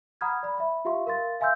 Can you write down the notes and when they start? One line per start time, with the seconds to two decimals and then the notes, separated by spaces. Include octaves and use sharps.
0.21 F#5 A#5 B5 D#6 F6 G#6
0.43 D5 B5
0.58 E5 B5
0.85 F4 G4 E5 F5 C6 C#6
1.07 A#4 F5 C6 A6
1.40 E5 F5 G#5 C6 E6 G6